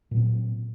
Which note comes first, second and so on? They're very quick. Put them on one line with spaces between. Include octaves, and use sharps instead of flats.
A#2 F#3 C4